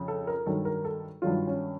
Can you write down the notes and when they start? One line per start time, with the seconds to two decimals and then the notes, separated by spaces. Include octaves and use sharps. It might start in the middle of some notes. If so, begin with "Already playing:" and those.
Already playing: F2 C#3
0.08 A4
0.27 A#4
0.46 G2 D#3 F#3 A4
0.65 A#4
0.85 A4
1.22 G2 D#3 F#3 F4
1.47 C#4